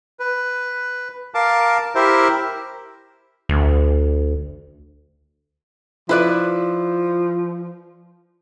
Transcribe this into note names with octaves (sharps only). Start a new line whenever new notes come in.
B4
A#4 F5 A5 D6
E4 G4 A#4 C5 E5
D2
F3 E4 B4 D5